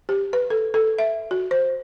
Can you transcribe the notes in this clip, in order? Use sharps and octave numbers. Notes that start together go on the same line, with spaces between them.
G4
B4
A4
A4
E5
F#4
C5